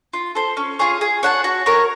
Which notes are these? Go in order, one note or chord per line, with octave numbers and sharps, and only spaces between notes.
F4
A4 C5
C#4
F4 G#4 C#5
G#4
C#5 F#5 A5
F#4
A#4 C#5